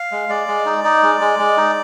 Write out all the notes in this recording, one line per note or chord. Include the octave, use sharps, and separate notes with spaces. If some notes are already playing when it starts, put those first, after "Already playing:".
Already playing: F5
G#3
G#3 D5
G#3
D#4
D#4
G#3
G#3
G#3
D#4